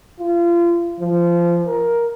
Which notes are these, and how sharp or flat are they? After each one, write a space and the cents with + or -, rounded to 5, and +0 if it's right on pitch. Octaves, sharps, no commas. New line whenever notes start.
F4 -30
F3 -20
A#4 +10